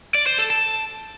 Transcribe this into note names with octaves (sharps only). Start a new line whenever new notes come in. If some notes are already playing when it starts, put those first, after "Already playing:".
D5
C5
A4
A5